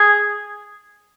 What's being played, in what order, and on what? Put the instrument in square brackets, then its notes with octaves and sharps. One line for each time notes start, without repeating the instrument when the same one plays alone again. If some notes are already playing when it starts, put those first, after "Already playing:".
Already playing: [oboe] G#4